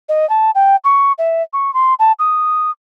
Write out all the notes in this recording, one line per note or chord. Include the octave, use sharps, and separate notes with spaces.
D#5
A5
G5
C#6
E5
C#6
C6
A5
D#6